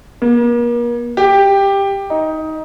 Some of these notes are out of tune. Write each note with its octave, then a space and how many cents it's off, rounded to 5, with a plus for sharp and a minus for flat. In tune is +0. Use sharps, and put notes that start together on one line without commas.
A#3 +40
G4 +10
D#4 +15